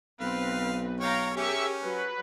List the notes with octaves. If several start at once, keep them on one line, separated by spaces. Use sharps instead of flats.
B1 C4 B4 F5
C#5 F5 G5 A#5
C#4 G4 G#4 A#4 E5 C#6
F#3 B4